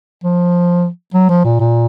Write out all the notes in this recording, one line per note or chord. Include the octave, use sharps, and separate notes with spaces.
F3
F#3
F3
A#2
A#2